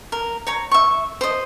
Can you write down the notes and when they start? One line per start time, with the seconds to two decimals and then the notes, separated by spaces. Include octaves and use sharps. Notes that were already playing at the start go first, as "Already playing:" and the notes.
0.12 A#4
0.47 C#5 A#5
0.71 E5 C#6
1.21 C5 D#5